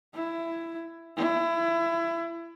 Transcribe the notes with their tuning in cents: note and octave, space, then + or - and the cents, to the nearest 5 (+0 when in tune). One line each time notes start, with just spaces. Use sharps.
E4 +15
E4 +25